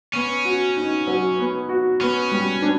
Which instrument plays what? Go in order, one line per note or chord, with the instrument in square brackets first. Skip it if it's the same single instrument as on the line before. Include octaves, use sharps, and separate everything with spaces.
[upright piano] B3 [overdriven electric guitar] C#4
[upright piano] F#4
D#4
F#3
B3
F#4
[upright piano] B3 [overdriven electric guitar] C#4
[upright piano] G3
D4